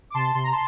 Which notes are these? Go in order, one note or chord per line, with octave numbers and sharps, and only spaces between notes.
D6
C3 A5 C6
C3 C6
A#5
A5 C6